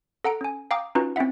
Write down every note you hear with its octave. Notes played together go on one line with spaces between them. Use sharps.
A4 F#5 A#5 D7
C#4 G#5
F5 G5 A#5 D6 D#6
C#4 D#4 F4 F#4 B4
C4 C#4 E4 E5 F#5